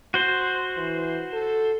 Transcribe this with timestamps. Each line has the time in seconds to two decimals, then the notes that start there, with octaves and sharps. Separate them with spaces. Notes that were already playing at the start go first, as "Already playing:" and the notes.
0.14 F#4 C5
0.77 E3
1.33 A4